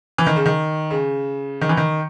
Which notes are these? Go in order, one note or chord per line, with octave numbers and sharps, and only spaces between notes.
E3
D#3
C#3
D#3
C#3
D#3
E3
D#3